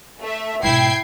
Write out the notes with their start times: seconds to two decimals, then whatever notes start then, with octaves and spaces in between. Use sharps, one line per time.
0.21 A3 E5
0.63 G#2 B2 E4 G5 G#6 C7